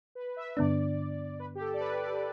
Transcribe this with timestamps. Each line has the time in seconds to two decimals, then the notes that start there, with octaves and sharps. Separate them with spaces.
0.15 B4
0.36 E5
0.57 G2 D3 B3 D4 D5
1.40 B4
1.55 G4
1.61 A4
1.74 D5
1.80 B4
2.02 D5